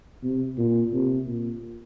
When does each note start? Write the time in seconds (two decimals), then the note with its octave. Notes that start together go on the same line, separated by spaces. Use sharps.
0.23 C3
0.58 A#2
0.93 C3
1.27 A#2